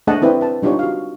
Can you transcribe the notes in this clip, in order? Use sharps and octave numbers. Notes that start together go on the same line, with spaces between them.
A3 D4 G#4 D#5 F#5 A5
C4 E4 B4 C5 D5 G5
B4 A5
G3 D4 D#4 F4 G4 C#5
F#4 F5